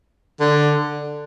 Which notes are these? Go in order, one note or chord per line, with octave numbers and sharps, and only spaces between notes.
D3